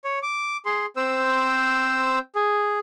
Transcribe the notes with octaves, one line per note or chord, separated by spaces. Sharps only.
C#5
D6
G#4 C6
C4 C5 E6
G#4